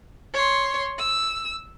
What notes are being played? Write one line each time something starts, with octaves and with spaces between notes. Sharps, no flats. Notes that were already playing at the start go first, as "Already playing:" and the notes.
C#5 C6
E6